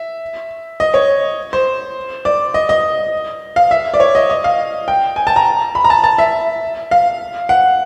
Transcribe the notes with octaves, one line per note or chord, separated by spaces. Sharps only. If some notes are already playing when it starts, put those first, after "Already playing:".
Already playing: E5
D#5
C#5
C5
D5
D#5
D#5
F5
E5
D5
C#5
D#5
D#5
F5
G5
G#5
A5
A#5
B5
A#5
A5
A5
E5
F5
F#5